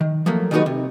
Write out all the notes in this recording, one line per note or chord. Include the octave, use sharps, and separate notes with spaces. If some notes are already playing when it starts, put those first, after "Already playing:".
D#3
F3 F#3 A3 A#3
D#3 G3 A3 D#4 F#4 B4
C3